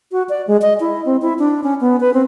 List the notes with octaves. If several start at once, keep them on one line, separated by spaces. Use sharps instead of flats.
F#4
D5
G#3
D#5
E4
C4
E4
D4
C#4
B3
B4
C4